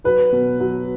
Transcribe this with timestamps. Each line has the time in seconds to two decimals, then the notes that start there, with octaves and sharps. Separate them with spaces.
0.04 F#3 B4
0.32 B2
0.60 F#3